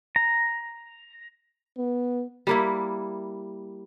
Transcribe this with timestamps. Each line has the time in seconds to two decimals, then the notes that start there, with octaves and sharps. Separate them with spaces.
0.16 A#5
1.77 B3
2.47 G3 A#3 E4